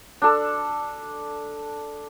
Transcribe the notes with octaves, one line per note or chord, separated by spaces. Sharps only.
D4 A4